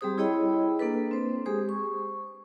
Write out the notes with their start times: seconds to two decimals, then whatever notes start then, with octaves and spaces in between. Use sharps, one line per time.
0.01 G3 C4 G4 G#4 C5 D#6
0.18 E4 G#4 C#5 D#5 G5 B5
0.79 A#3 D4 A4 B4
1.11 C4 C5
1.46 G#3 G4 G#4 C5 D#6
1.69 C#6